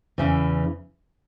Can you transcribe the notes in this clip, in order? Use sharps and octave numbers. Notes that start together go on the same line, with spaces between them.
E2 C#3 E3